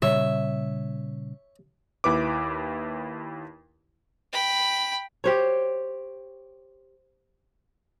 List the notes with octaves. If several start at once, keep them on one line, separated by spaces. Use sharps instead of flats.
A#2 C#3 G3 C#5 E5
D#2 E4 B4 D6
G5 B5
G4 C5 C#5